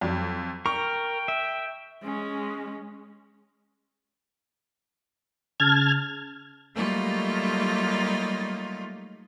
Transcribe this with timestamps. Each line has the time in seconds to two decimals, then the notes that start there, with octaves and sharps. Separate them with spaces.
0.01 F2 F#3
0.66 A#4 G5 C#6
1.28 E5
2.04 G#3 C#4
5.60 C#3 A5 F6 G#6
6.75 F#3 G3 A3 A#3 D#4 F4